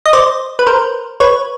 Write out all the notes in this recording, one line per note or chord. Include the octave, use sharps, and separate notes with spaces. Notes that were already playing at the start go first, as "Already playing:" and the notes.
D#5
C5 D5
B4
A#4 C5
B4 C#5